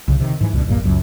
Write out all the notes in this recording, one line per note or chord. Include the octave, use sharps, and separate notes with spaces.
C2 C#3
C3 D#3
G#2 E3
C#2 B2 D3
D1 A#1 G2 A#3
F#1 C#2 F#2